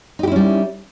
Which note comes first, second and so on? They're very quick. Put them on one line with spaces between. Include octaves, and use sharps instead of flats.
D#4 G4 E4 C#4 G3